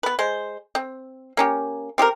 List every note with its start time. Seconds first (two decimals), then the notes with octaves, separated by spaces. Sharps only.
0.03 B3 B4
0.19 G#3 C5
0.75 C4
1.37 A#3 C#4 G4
1.98 C4 G4 G#4 A#4